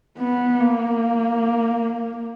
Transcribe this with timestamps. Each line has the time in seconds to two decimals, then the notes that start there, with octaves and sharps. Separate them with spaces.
0.18 B3
0.60 A#3